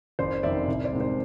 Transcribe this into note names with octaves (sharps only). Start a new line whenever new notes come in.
F#1 C5 D5
F2 C3 D#3 D5 E5
C2
C5 D5
C3 D#3 G#3
C5